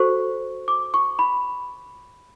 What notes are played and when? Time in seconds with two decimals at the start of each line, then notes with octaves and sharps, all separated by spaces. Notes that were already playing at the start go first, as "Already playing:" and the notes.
Already playing: F#4 A4 C5 C#6
0.68 D6
0.94 C#6
1.19 B5